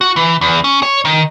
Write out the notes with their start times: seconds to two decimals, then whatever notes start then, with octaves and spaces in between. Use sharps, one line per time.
0.01 F#4
0.16 E3
0.41 E2
0.64 C#4
0.83 C#5
1.05 D#3